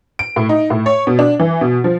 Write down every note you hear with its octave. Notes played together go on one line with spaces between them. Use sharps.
D7
A2
D#4
A2
C#5
B2
D4
E3
B2
F3